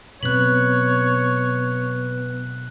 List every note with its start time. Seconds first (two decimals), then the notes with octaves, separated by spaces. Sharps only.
0.23 B2 F#3 B3 C4 B4 C#5 F#6 F#7